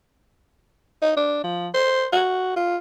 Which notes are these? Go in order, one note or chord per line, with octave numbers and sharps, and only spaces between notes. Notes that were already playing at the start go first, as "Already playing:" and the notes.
D#4
D4
F3
C5
F#4
F4